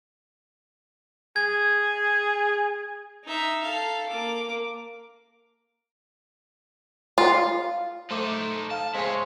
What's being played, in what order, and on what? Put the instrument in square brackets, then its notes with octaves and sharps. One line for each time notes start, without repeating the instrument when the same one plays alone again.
[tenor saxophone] G#4 [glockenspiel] G#6
[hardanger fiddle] D#4 E5
A4 F5
A#3 D6
[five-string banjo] F4
[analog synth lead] A3 [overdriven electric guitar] D#4 A4 [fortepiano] C5 D6
[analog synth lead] F5 [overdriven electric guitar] A5
[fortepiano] G#3 G#4 [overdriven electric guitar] E4 C#5 [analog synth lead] C5